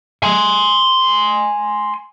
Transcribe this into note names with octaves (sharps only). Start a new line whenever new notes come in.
G#5 C6